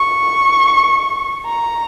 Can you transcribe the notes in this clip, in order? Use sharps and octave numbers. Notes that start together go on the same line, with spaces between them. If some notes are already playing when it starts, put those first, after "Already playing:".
Already playing: C#6
A#5